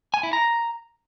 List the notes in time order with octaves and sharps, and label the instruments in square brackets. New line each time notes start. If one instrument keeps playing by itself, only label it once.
[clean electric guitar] G#5
E4
A#5